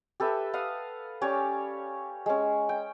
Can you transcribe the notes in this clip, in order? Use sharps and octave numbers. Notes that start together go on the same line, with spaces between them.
G4 A4 B4 E5
B4 F5 F#5 D#6
C#4 G4 C#5 D5
G#3 C#4
G5